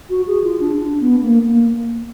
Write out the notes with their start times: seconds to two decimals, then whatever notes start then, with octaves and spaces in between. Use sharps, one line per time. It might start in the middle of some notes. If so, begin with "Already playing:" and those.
0.10 F#4
0.27 G#4
0.44 F4
0.60 D4
0.77 D4
1.00 B3
1.23 A#3
1.45 A#3